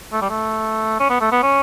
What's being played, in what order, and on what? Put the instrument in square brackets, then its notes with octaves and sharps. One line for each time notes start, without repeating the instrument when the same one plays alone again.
[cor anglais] A3
G3
A3
C#4
B3
A3
B3
C#4